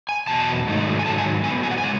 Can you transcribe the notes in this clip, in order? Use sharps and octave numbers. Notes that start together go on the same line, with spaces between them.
G#5
E2 B2 F#3 A5
G#2 D#3 F#3 A3 D#4
G#5
G#2 D#3 F#3 A5
G#5
A2 F#3 B3 G#5
G#5
F#5
G#5
C#3 G#3